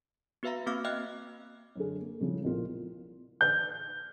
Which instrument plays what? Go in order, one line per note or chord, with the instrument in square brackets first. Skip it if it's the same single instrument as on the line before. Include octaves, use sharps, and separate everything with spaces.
[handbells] B3 F#4 B4 E5 F5 A#5
A#3 C4 F#4 F5 D6 F6
D#5 E5 G5 F6 F#6
[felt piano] F#2 D3 D4 G#4
A#3
A2 C#3 F3 G3
A#1 A2 B3 F4 A#4
[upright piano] G6